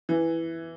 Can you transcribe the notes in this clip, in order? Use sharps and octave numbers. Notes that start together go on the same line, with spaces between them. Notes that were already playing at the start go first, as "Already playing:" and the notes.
E3